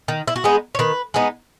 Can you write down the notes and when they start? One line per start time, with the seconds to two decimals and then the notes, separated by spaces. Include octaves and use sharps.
0.08 D#3
0.28 E4
0.36 F#4
0.44 G#3 B3 D#4 G#4
0.75 C#5
0.79 D#3 B4
1.14 G#3 B3 D#4